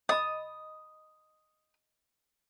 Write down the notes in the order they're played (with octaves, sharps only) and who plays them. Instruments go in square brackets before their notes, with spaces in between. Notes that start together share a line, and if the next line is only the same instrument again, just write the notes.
[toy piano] D#5 B5 [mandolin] D#6